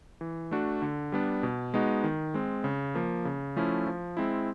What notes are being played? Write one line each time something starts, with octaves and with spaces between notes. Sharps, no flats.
E3
A3 D4 F#4
D3
G3 B3 D4
B2
G#3 B3 D#4 F#4
D#3
G#3 C4
C#3
F3 A#3
C#3
F3 A3 C#4 E4
F3
G#3 C4 E4